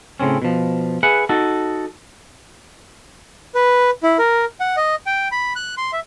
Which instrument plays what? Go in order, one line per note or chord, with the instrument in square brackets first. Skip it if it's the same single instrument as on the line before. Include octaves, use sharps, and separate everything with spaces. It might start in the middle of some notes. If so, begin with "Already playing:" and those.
[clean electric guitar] A2 C#3 C4 C#4
B2 F3
G#4 B4 E5 F#5
D#4 F#4 A4
[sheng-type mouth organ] B4
E4
A#4
F#5
D#5
G5
B5
F#6
C6
E5